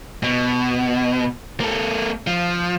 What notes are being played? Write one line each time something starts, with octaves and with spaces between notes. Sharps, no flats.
B2
A#3 A4
F3